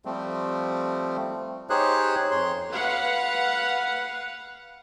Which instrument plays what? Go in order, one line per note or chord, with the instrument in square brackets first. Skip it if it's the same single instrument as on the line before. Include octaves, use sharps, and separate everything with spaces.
[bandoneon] F3 G3 A3 C4
D#4 G4 G#4 C5 C#5 F#6
F2 C#5 C6
[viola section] B4 F5 F#5